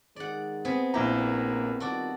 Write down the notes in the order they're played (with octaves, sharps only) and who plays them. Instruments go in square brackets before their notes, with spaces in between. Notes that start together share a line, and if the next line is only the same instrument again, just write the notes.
[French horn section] D#3 G#3 [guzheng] D5 F#5
[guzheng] B3 C4 G#4
[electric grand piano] A#1 E4 A#5 [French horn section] A#3 [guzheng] G4
[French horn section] D#3 G3 F4 [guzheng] F#4 A4 D5